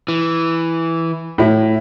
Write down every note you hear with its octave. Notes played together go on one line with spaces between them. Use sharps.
E3
A2 E4